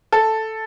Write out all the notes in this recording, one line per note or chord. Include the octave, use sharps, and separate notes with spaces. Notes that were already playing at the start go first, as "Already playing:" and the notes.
A4